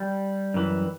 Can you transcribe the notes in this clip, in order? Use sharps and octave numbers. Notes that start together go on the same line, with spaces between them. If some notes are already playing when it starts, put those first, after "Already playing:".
Already playing: G3
F#2 E3